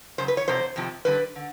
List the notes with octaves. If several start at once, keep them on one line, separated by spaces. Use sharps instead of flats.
F#2 C#3 C5
B4
C#5
F2 C3 F3 C5
F2 C3 F3
G2 D3 G3 B4
D3